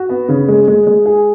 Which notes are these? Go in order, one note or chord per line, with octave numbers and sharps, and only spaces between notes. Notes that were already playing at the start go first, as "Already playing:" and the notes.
Already playing: F#4
B3
C#3
G#3
G#3
G#3
G#4